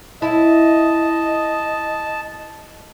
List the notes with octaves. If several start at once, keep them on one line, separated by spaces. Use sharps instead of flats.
E4 D#5 A5